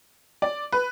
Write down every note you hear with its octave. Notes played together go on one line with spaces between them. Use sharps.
D5
B4